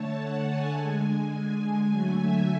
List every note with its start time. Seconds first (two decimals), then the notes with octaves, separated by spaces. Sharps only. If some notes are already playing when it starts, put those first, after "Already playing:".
Already playing: D3 A3 C#5 A5
0.18 F#5
0.46 G#5
0.74 D3 G#3
1.88 D3 F#3 A3 G#5
2.18 E5